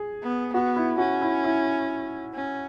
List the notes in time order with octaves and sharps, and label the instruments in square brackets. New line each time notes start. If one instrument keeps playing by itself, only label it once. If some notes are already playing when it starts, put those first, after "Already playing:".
Already playing: [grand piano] G#4
[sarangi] B3
[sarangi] B3 [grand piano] F#4
[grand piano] E4
[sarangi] C#4 [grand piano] F#4
[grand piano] E4
E4
[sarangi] C#4